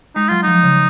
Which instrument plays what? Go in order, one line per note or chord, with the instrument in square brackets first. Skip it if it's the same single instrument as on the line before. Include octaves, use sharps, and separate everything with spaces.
[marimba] G#3 [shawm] D#4
[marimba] F#3 [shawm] F4
[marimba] F3 [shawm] D#4
[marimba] C#3